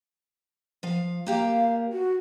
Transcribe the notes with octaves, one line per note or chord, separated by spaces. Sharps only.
F3 F5
A#3 G4 A#4 F5
F#4